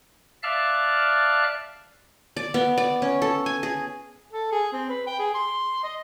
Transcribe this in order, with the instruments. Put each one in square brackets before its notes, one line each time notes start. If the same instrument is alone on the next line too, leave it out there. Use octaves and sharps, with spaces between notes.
[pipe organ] D5 E5 F5 A5 F6 F#6
[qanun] D5
B3
D5
C#4
A4
G#5
G#4
[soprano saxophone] A4
G#4
C4
B4
G5
G#4
C6
D#5